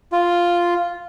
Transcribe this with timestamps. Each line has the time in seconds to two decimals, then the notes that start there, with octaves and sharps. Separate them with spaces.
0.12 F4